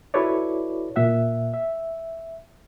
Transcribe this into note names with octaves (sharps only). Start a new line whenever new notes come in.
E4 F#4 A4 B4 C#5 D5
A#2 E5 F#5
E5